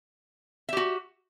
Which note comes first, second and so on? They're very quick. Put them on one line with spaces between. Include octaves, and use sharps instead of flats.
E5 G4 F#4